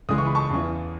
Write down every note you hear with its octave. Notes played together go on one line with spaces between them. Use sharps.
C#2 C#3 E3 G#3 D#6
C#6
B5
A5 C#6
E2 C#3 E3